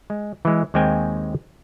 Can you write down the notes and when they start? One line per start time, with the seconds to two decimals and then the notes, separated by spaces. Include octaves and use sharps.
0.10 G#3
0.45 E3 G#3
0.74 D#2 D#3 G#3 C4 G5 G#5